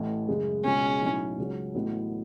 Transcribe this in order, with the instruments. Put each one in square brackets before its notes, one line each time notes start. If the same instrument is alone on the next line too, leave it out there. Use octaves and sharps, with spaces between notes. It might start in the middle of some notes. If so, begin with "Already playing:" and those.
Already playing: [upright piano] A1 A2 E3
F#2 C#3 G#3
[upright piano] C#2 B2 G#3 B3 [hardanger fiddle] C#4
[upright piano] B1 A2 F#3 B3 E4
C#2 C#3 F#3 C#4
A1 A2 F#3 B3